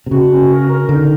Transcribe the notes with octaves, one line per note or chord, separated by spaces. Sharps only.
C3
C#3 F#4
C#4
A#4
A#4
D3 D#4